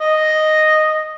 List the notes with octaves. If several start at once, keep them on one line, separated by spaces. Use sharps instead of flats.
D#5